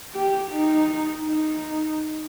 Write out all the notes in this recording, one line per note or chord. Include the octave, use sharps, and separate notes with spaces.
G4
D#4
D#4